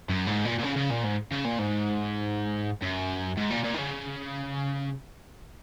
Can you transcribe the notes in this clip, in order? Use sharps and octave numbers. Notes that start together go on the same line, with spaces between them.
F#2
G#2
A#2
A#2
C#3
C#3
A#2
G#2
C#3
A#2
G#2
F#2
G#2
A#2
A#2
D#3
C#3